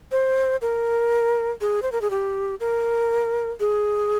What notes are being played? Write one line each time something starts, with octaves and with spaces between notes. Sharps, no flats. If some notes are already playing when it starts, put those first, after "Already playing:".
C5
A#4
G#4
C5
A#4
G#4
G4
A#4
G#4